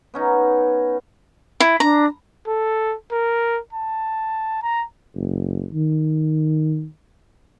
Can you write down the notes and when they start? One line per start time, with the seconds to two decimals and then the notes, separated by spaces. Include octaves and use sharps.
0.14 B3 C#4 D#4
1.60 E4
1.80 D4 A#5
2.48 A4
3.12 A#4
3.73 A5
4.63 A#5
5.16 F#1
5.74 D#3